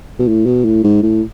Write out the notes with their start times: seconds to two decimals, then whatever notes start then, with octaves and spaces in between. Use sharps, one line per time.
0.19 B2
0.28 A2
0.46 B2
0.65 A2
0.84 G#2
1.03 A2